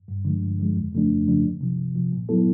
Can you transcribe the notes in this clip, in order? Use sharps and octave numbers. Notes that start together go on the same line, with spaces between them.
G2
D3 F3 G#3
G2
D3 F3 G#3
F2
C#3 F3 A3 D4
F2
C#3 F3 A3 D4
C2
C3 F3
C2
C3 F3
A#2
F#3 B3 E4 A4